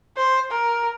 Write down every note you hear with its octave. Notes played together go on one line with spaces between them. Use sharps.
C5
A#4